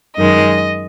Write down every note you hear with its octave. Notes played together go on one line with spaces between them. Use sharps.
F#2 D#3 G#3 D#5